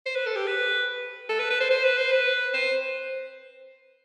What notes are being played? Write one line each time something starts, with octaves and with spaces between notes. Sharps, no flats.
C5
B4
A4
G4
B4
A4
B4
B4
C5
C5
B4
C5
B4
C5